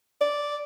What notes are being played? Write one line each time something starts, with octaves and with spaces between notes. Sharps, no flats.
D5